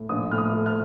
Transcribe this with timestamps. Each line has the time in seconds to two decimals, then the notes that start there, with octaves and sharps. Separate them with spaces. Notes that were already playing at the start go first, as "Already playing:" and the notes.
Already playing: A2
0.09 A#1 D#6
0.31 A2 F6
0.38 D#6
0.53 A3
0.66 F6